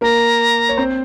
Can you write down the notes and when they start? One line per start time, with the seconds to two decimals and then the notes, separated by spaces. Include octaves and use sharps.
0.01 A#3 A#4 A#5
0.69 C#5
0.77 C4 C5